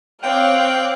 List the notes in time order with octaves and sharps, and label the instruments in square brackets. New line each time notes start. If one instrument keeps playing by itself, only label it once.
[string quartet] C4 [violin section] C#5 D6 F#6 [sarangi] F5 [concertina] G5